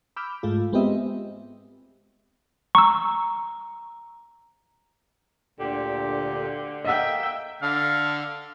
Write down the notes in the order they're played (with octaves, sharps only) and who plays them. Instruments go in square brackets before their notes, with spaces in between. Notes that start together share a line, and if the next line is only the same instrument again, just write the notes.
[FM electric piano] B5 D6 E6 F6 G6
G#2 G#3 A3 F4
G#3 B3 C4 G4 D#5 E5
[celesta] A#5 [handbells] C#6 E6
[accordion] D2 A#2 G4 [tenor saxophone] D3
[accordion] A#3 [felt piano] D#5 F#5 [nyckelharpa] E5 G5
[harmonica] D3 F5 A5